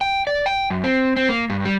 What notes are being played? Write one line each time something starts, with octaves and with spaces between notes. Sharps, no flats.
G5
D5
G5
F#2
C4
C4
A#3
G2
G3